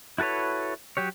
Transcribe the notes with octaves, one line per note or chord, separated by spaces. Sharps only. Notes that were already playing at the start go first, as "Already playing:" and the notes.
E4 F#4 A4 B4 C#5
F#3 G4 C#5